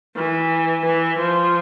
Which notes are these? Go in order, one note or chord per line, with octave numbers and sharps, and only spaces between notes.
E3
E3
F3